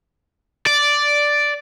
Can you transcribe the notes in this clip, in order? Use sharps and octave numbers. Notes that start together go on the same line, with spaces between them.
D5